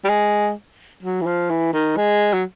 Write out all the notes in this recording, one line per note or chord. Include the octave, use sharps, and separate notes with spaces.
G3
G#3
F#3
E3
F3
E3
D#3
G#3
F#3